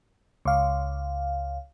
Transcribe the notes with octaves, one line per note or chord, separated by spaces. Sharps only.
C#2 F5